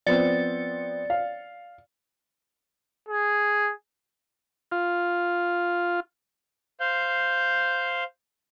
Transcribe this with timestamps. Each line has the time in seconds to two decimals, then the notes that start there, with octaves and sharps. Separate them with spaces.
0.07 F3 B3 C4 D5 A6 C#7
1.10 F5
3.08 G#4
4.72 F4
6.80 C5 F5 G6